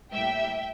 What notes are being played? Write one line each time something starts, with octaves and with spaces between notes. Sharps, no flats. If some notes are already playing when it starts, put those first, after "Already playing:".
A2 G3 A#3 E5 G5